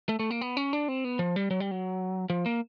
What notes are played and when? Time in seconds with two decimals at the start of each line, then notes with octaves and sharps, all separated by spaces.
0.09 A3
0.19 A3
0.30 A#3
0.41 B3
0.57 C#4
0.73 D4
0.88 C4
1.05 B3
1.19 F3
1.36 G3
1.51 F#3
1.60 G3
1.71 F#3
2.30 F3
2.46 A#3